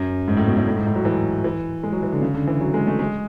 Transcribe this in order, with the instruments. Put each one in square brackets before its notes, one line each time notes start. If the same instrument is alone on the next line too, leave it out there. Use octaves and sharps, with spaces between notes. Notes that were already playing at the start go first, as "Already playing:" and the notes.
Already playing: [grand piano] F#2
G#2
A2
B2
A2
A2
G#2
A2
F#3
E3
E3
G#3
F#3
E3
D3
C#3
D3
E3
F#3
G#3
A3
G#3